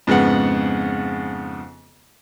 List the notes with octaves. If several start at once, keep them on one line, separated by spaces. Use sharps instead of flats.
F2 G#2 C#3 B3 F#5